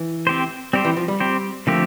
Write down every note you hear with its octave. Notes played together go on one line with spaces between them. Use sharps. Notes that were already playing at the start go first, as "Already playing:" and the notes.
Already playing: E3
C4 G4 C5
G3 C4 G4 C5
E3
F3
G3
C4 G4 C5
D3 F3 A3 A#3 C4 G4